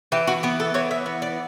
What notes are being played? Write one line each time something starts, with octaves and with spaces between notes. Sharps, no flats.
E3 G4
F#4
B3 G4
A4
E3 C#5
E5
B3
D5